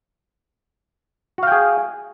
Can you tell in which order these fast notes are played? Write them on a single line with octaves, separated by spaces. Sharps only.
F#4 F5 G5 G#4